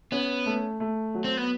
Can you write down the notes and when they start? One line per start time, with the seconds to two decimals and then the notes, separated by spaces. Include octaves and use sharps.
0.12 B3 C#4
0.46 A3
0.80 A3
1.15 F#3
1.24 C4
1.37 B3